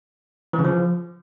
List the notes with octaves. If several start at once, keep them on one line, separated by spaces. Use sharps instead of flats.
E3
C#3
F3